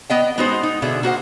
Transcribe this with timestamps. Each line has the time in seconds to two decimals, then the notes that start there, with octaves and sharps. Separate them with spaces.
0.10 B3 D#5 G5
0.38 G#3 B3 D#4 F#4 B4 C5
0.63 D#4
0.82 B2 D3 G#4 E5
1.03 A#3 F#4 C5 F#5